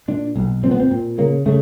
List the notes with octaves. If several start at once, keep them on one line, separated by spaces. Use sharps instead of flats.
A#2 D4
B1
A#2 C4
B3
C4
A#2
C#3 A#3
C#3 A3